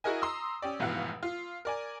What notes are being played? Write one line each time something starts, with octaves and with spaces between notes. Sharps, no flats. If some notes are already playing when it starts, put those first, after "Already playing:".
E4 F#4 G#4 A#4 D#5 G#5
A#5 C6 D#6 E6
C#4 G4 D5
F1 G#2 B2 E3 F5 F#5
F4
A#4 D5 G#5